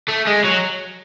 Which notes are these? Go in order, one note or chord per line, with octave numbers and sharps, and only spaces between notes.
A3
G#3
F#3